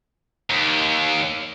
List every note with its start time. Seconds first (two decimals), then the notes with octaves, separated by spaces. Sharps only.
0.50 D#2